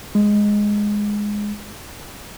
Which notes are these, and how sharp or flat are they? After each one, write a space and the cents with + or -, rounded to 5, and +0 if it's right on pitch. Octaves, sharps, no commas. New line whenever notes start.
G#3 -5